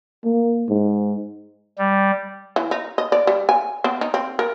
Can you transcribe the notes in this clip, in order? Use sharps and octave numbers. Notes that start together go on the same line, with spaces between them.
A#3
G#2
G3
E3
D#4
D#5
D5
G3
G#5
B3
D#4
C4
A#4